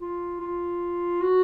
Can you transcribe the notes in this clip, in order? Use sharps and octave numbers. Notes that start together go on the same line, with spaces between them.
F4
F4
F#4